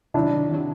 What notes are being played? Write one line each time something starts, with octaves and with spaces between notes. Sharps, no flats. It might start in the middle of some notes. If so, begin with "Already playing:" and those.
C3 D#3 F#3 D4 E4
C3 D#3 F#3